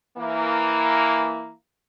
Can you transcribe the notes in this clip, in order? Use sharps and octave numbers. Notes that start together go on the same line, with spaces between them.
E3 A#3 E4